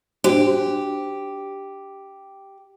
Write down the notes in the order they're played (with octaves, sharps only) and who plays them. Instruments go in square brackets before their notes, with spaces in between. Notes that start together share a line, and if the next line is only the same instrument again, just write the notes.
[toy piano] D4 F#4 C5 [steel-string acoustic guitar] G4